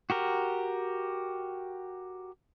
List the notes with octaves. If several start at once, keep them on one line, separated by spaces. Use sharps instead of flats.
F#4 G4 A#4